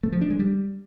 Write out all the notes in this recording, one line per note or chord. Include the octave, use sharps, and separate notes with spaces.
A3
F3
D4
G#3
G3